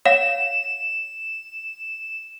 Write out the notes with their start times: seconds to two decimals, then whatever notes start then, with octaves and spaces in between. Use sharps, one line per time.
0.05 C#5 F5 F#5 E7